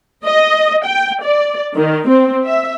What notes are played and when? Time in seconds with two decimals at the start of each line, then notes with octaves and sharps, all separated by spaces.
0.24 D#5
0.85 G5
1.23 D5
1.75 D#3
2.08 C4
2.46 E5